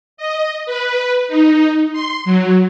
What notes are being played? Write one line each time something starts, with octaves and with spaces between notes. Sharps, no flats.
D#5
B4
D#4
C6
F#3